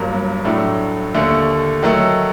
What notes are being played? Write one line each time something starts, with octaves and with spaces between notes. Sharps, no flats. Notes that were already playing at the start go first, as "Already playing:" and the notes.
Already playing: G1 G2 F#3 A#3
A2 F#3 A3 D4
D#2 D3 A3
D#3 F#3 A3